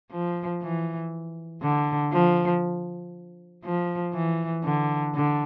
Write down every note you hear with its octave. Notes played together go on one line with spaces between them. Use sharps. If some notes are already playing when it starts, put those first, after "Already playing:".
F3
E3
D3
F3
F3
E3
D3
D3